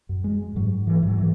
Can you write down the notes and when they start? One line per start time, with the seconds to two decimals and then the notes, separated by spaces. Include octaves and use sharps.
0.09 F#2
0.24 G#3
0.56 G#2 F#3
0.87 E3
1.03 G#2
1.08 F#3
1.18 E3